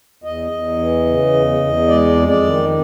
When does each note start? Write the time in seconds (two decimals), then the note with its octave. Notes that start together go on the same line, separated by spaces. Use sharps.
0.23 E2 D#5
0.51 E2
0.78 E3
1.05 C#3
1.33 E2
1.60 E2
1.88 G#3 D5
2.15 F2
2.28 D5
2.43 D#3